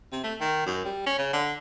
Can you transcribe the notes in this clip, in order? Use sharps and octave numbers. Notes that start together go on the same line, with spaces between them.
C3
A3
D#3
F#2
G3
C#4
C#3
D3